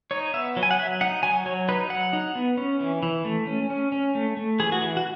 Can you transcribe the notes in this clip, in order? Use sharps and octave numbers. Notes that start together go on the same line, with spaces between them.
D#4 C#5
B3 E5
F#3
G#5
F#5
F#3 E5
D#4 F#5
F#3 G#5
F#3 C#5
D#4 B4
F#3 F#5
D#4
B3
C#4
E3
E3
A3
C#4
C#4
C#4
A3
A3
E3 G#4
F#4
E3
F#4